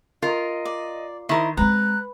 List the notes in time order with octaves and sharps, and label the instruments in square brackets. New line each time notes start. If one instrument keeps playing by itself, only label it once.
[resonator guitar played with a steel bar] F4 A#4 [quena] D#5
[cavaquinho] D5
[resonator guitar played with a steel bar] D#3 [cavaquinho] E4 A#4 C5
[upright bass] G#3 C4 [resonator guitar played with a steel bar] B4 [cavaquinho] A#5 [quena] F#6